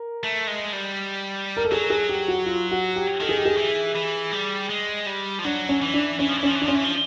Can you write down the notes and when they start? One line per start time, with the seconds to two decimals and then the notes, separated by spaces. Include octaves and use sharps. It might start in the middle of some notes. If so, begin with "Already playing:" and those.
Already playing: A#4
0.24 A3
0.48 G#3
0.73 G3
1.57 A#4
1.65 A4
1.72 F#3 G#4
1.90 G#4
2.09 G4
2.28 F#4
2.46 F4
2.71 F#4
2.96 G4
3.21 D#3 A4
3.29 G#4
3.37 G4
3.45 G#4
3.58 E3
3.95 E3
4.32 G3
4.69 G#3
5.06 G3
5.39 F3
5.44 F#3 D4
5.69 C#4
5.82 E3
5.94 D4
6.19 E3 C#4
6.28 F3
6.37 E3
6.43 F3 C#4
6.55 E3
6.61 D4
6.65 F3 C#4
6.75 E3
6.84 F3